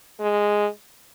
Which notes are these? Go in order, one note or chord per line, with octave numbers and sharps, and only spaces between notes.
G#3